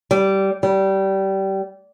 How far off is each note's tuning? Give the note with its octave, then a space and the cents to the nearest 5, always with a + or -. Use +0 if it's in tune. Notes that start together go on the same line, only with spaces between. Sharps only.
G3 -15
G3 -20